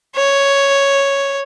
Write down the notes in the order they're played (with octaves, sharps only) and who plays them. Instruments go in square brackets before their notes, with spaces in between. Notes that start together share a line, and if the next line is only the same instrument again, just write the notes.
[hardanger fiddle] C#5